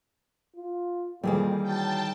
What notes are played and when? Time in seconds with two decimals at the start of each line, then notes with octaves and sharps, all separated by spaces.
0.57 F4
1.24 F2 D#3 E3 G3 A#3 G#4
1.63 F#3 G5 A5